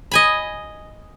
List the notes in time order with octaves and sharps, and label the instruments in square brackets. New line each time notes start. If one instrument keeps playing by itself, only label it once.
[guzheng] D#5 G#5 B5